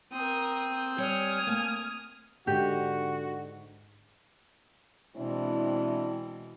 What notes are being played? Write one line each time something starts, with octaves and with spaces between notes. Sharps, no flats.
C4 A#4 G5 D#6
G3 C#5 G#5 D#6 F6
A3 A#3
G#2 D3 F#4 G4
B2 E3 G#3 C4 D4 E4